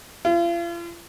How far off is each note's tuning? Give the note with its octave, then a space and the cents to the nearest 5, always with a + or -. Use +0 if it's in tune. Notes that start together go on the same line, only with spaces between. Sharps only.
F4 -40